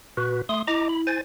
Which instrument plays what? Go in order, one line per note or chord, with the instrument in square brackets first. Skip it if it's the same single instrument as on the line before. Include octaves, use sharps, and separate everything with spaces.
[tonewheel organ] A#2 F#4 B4
A3 C6 D#6
[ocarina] E4 [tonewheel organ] D#5 A#5 D6
[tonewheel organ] B5
C5 G#5 A6